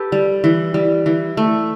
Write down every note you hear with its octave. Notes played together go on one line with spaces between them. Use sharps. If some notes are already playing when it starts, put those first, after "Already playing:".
Already playing: G4 A4 B4
G3
E3
G3
E3
A3